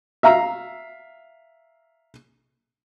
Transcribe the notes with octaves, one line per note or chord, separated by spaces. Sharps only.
E5 F5 A#5 E6